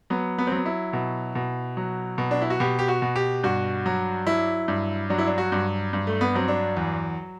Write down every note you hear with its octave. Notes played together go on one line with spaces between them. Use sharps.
F#3 B3
B3
C4
F#3 B3
E4
B2
B2
F#3
B2
D4
E4
F#4
B2 G4
G4
F#4
B2
G4
G2 F#4
F#3
F#3 E4
G2
F#3 D4
E4
D4
F#4
G2
G2
A3
B3
F#3 C4
D4
E2